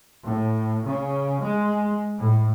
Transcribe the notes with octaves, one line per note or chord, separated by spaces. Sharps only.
A2
C#3
G#3
A2